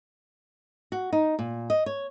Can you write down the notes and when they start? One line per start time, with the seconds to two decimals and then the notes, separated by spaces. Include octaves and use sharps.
0.92 F#4
1.13 D#4
1.39 A#2
1.70 D#5
1.86 C#5